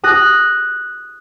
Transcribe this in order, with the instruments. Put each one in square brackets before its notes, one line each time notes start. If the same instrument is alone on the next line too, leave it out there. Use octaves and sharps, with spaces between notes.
[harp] D#6 F#6 A#6